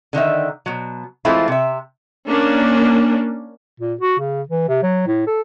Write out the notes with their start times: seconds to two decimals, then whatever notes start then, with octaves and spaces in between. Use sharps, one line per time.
0.13 D3 D#3 D#4 E5
0.66 B2 F#3
1.25 E3 G#3 A3 C4 E4 F4
1.48 C3 E5
2.28 A#3 C#4 D4
3.80 A#2
4.01 F#4
4.19 C#3
4.49 E3
4.69 C3
4.83 F#3
5.07 A2
5.27 A4